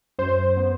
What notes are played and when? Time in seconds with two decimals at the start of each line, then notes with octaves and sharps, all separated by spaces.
0.19 F#2 C5
0.57 B3